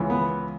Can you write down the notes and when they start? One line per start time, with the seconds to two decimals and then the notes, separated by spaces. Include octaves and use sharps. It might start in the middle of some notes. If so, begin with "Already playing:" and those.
Already playing: C#2 C#3 E3
0.10 B3